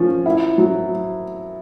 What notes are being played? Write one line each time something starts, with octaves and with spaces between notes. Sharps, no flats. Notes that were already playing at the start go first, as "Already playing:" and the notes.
Already playing: F3 C#4
E4
F#3